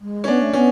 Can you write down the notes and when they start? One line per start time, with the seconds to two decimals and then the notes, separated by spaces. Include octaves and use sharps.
0.01 G#3
0.24 C#4
0.28 B3 D4
0.42 A3
0.53 B3 C#4